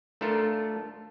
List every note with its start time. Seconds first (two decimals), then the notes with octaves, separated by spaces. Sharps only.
0.21 A3 D4 F4 A4 A#4